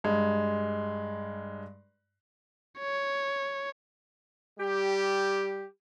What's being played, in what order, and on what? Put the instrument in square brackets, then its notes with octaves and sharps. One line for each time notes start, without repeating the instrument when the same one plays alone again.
[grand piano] G2 G#3
[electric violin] C#5
[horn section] G3 G4